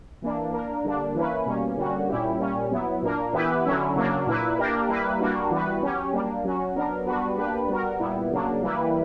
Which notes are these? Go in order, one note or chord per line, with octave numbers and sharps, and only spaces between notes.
E3 A#3 D4
A#3 D4 A#4
D3 G3 A#3 D4
E3 A#3 C#4 E4 B4
B2 G3 A#3 C#4
D3 G3 A#3 C#4 F#4
A#2 G3 C#4 E4 G4
A#2 G3 C#4
F#3 B3 E4
A#2 A#3 D4 A#4
E3 B3 E4 G4 B4
D3 F#3 C#4 E4
C#3 F#3 A#3 D4
A#2 A#3 E4 B4
A#3 D4 G4 A#4
G3 A#3 E4 B4
G3 A#3 D4 F#4
E3 G3 B3 F#4 B4
F#3 C#4 G4
G3 A#3 D4
F#3 C#4 F#4
F#3 B3 D4 A#4
G3 B3 D4 F#4 B4
A#3 D4 G4 B4
G3 B3 F#4 A#4
A#2 G3 B3 E4
C#3 F#3 A#3 D4
E3 G3 A#3 E4 B4